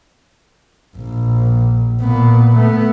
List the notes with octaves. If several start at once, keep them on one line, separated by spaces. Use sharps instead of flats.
A#1
A#2 B3
A3 B3